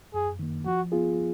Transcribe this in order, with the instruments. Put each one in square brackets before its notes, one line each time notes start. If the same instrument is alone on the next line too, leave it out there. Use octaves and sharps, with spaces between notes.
[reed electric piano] F#2 [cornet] G#4
[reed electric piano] D#3 A#3
[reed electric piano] F3 [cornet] F#4
[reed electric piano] B3 F4 G#4